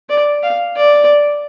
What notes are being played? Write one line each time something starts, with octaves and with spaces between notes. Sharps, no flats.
D5
F5
D5